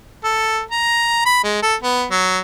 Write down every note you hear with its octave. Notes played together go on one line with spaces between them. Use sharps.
A4
A#5
B5
G#3
A4
B3
F#3